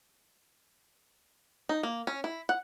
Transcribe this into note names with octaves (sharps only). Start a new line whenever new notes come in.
D#4
A#3
C#4
E4
F#5